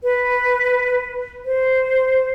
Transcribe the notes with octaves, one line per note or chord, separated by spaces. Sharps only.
B4
C5